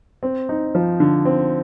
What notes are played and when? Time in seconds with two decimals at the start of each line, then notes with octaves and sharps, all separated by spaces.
0.23 C4
0.49 D#4
0.75 F3
1.00 D3
1.25 C4